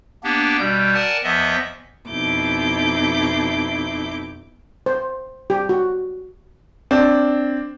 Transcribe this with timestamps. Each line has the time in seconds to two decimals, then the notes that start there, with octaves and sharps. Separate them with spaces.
0.24 A#3 B3 D4 G4
0.58 B2 G3 G6
0.94 A#4 D5 F#5 G#5 A5
1.24 E2 F3 B3 D#5 E5
2.07 F2 B2 D#4 E4 D6 G6
4.86 C5
5.50 G4
5.69 F#4
6.91 C4 D4